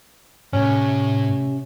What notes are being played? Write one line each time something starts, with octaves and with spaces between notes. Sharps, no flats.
A2 C3 C#4